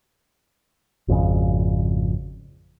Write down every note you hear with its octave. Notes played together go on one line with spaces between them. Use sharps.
G#1 F2 C#3